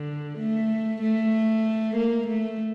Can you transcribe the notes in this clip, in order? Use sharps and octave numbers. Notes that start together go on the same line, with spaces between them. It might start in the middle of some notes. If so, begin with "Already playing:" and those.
Already playing: D3
A3
A3
A#3
A3